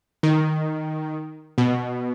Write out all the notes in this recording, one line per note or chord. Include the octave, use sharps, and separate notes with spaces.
D#3
B2